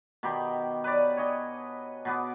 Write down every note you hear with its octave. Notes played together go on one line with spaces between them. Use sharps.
B2 D#3 G4 B5
B4 C#5 D5
C#5 D#5 G#5
B2 B3 D6